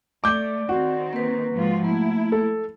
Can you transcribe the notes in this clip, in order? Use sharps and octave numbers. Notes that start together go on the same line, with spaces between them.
A3 D5 D6 G6
D#3 C4 F#4
A#3 B4
G#2 F3 F4
A3 A#3 E4
A4